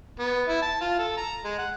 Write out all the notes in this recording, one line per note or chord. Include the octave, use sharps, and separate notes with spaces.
B3
E4
A5
F4
A4
A#5
G#3
F#5